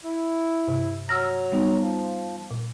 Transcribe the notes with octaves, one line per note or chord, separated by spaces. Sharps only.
E4
G2 C3
F#3 A#5 E6 F6 A#6
G3 B3 D#4
F3
A#2